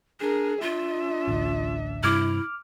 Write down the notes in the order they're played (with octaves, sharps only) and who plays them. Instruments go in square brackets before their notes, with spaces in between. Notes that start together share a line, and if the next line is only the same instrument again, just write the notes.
[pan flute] D4 [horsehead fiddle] G#4 A#4
[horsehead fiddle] D4 E5 [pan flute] F4
[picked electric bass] A1 D2
[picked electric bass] G2 C3 [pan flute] E4 [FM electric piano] D6 F6